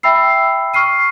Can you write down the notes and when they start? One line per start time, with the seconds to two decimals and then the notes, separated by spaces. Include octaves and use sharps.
0.03 E5 G5 B5 E6 C7
0.74 C#6 F6 C7 D#7